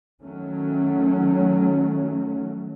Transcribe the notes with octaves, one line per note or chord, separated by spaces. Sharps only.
D#3 F#3 A3 C#4